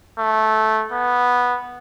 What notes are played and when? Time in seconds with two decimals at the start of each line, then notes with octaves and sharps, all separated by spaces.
0.19 A3
0.92 B3